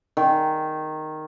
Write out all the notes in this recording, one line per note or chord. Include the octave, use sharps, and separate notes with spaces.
D#3